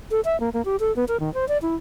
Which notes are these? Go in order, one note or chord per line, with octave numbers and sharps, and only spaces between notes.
A4
E5
A#3
A#3
G4
A4
B3
A#4
D#3
C5
D5
E4